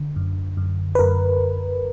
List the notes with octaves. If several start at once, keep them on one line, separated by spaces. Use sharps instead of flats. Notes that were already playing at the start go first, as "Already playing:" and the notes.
Already playing: D3
F#2
F#2
B4
F#2 A#4